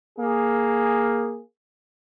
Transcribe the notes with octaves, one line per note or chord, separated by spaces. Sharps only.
A#3 G#4